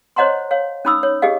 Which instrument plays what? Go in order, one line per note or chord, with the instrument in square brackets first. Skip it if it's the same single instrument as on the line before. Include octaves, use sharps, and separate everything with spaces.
[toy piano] C5 C#5 D#5 F#5 A#5 C6
C#5 F5
C#4 D#4 B5 D#6 E6
C#5
G4 G#4 D#5 F5